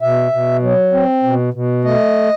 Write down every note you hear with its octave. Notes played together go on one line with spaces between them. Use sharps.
B2 E5
B2
F#3
C4
B2
B2
A3 D#5